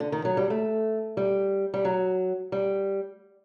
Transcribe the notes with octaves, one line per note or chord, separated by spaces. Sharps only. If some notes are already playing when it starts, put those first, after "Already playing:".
D3
D#3
F#3
G3
A3
G3
G3
F#3
G3